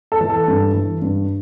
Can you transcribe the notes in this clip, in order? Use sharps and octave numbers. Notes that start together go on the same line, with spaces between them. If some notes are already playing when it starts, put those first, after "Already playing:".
A4
E3
A4
G2
E3
G2